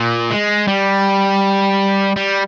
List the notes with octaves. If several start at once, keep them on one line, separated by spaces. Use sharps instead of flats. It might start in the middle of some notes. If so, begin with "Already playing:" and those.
Already playing: A#2
G#3
G3
G3